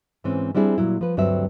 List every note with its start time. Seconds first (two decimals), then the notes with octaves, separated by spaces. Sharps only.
0.24 G#2 E3 C4 C#4
0.55 G3 C4 D4 E4 G#4
0.78 A#2 F#3 E4
1.01 F3 B4
1.17 D2 G2 F#3 G3 C4 E5